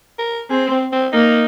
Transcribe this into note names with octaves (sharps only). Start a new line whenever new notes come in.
A#4
C4 G#4
C4
C4
A#3 D#4